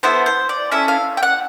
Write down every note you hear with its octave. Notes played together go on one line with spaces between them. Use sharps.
B3 E4 A4 C5
C5
D5
C#4 E4 A4 E5
F5
G5
F#5